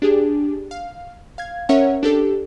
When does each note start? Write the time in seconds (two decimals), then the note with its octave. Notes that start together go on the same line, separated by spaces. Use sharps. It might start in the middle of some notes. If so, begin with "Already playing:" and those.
0.02 D4 G4 G#4
0.71 F5
1.38 F5 G#6
1.69 C#4 A#4 C#5 E5 F#5
2.03 D4 G4 A4